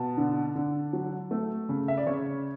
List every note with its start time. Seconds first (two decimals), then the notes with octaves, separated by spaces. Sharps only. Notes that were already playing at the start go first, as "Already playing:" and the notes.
Already playing: B2 A5
0.17 D3
0.56 D3
0.93 F#3
1.31 A3
1.69 C#3
1.88 E5
1.98 D5
2.06 C#3 C#5